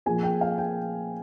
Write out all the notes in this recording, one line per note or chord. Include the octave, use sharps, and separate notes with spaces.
A#2 F3 G#4 G#5
G5
F5
G5